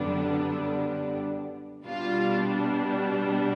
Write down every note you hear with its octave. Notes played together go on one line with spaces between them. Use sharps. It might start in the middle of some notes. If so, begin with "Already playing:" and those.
Already playing: F#2 D3 G3 B3 D4
B2 G3 B3 D4 F4